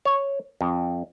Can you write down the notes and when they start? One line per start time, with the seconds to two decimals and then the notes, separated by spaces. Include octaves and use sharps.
0.05 C#5
0.61 F2